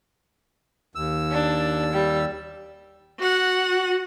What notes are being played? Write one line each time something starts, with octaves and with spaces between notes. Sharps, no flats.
D#2 E6
D4
G3
F#4 F#5